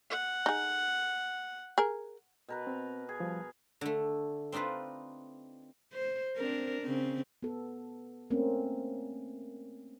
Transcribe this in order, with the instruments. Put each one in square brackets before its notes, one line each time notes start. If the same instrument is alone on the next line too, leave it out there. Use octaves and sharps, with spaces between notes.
[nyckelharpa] F#5
[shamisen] D#4 G#4
G#4 A#4
[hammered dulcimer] B2 A#4 B4
[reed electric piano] C4
[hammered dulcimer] G#4
[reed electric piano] F3 G3
[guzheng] D3 A3
C4 D4 D#4 F4 B4
[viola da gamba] C5
C4 D4 A#4
C#3 C4
[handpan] B3 A4
A3 A#3 C4 C#4